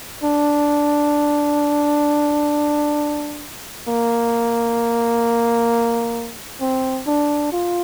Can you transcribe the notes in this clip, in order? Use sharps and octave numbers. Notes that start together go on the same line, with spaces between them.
D4
A#3
C4
D4
F4